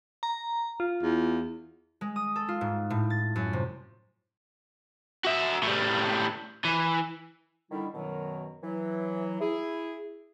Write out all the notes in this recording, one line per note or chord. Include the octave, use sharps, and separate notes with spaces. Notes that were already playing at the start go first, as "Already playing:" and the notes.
A#5
F4
E2
G#3
D#6
A4
F4
G#2
A2
A6
F#2
C3
F#4 E5
A2 G3
E3
D3 D#3 G3 E4
F#2 B2 D#3 F#3
E3 F#3
E4 G#4